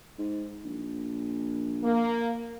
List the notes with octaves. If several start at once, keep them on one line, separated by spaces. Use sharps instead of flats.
G#2
A#1
A#3